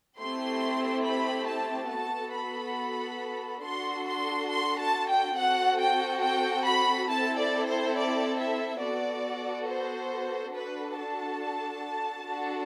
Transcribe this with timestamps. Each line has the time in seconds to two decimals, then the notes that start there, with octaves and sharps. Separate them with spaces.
0.19 A3 C4 E4 G4 C6
1.05 B5
1.48 A5
1.91 B3 F#4 A4 A5
2.35 B5
3.64 D4 F#4 A4 C6
4.08 C6
4.51 C6
4.79 A5
5.09 G5
5.37 C4 F#4 A4 F#5
5.80 G5
6.23 G5
6.66 B5
7.09 C4 E4 A4 A5
7.39 D5
7.68 C5
7.97 D5
8.39 E5
8.82 B3 F#4 A4 D5
9.69 C5
10.55 D4 F#4 A4 B4
10.98 A5
12.28 D4 F#4 A4